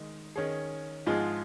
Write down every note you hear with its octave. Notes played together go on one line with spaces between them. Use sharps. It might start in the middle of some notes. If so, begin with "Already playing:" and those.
Already playing: D#3 G#3 D#4
D#3 C#4 G#4
G#2 F3 G#3 F4 G#4